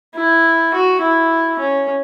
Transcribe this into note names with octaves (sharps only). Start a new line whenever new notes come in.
E4
F#4
E4
C#4